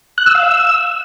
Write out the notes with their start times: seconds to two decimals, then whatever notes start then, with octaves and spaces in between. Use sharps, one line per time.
0.18 F#6
0.26 E6
0.35 F5
0.43 E6